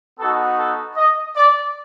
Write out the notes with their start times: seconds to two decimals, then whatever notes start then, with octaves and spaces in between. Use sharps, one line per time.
0.19 B3 D#4 F#4 A4
0.58 A4
0.97 D#5
1.36 D5